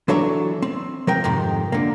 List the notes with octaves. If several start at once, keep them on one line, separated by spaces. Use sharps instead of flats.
E3 F#3 D4 A4 C#5 E5
C4
F3 A#4 G5
F2 G#2 C3 D#3
D3 A#3